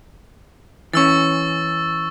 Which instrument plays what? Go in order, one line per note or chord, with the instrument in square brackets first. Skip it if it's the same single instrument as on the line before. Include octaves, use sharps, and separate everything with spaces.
[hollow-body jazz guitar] E3 C#4 [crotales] C#6 E6 A6